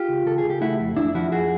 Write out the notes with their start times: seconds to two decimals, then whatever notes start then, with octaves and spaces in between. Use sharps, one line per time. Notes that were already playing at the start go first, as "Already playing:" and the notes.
Already playing: F4 G4
0.09 C#2
0.26 C#2 A4
0.38 G#4
0.44 C#2
0.50 G4
0.61 A3 E4 F#4
0.80 F2
0.96 F2 D4 E4
1.14 F3 E4 F#4
1.32 F2 F#4 G#4